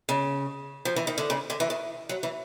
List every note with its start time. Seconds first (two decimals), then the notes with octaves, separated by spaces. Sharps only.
0.09 C#3
0.85 F3
0.96 E3
1.07 D#3
1.18 D3
1.30 C#3
1.50 D3
1.60 E3
1.70 D#3
2.09 F#3
2.23 E3